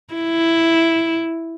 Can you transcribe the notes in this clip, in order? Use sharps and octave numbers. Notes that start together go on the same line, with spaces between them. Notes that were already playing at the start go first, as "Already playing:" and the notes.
E4